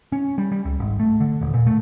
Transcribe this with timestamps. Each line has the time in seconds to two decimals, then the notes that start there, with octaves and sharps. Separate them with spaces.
0.12 C#4
0.38 G3
0.52 G3
0.65 C#2
0.80 G#1
1.00 A3
1.20 D3
1.41 D#1
1.54 A#2
1.67 A3